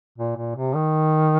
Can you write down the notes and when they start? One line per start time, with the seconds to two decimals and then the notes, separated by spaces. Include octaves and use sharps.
0.18 A#2
0.36 A#2
0.55 C3
0.75 D#3